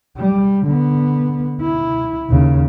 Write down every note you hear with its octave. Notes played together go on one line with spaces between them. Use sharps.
G3
D3 B3
E4
D#2 C#3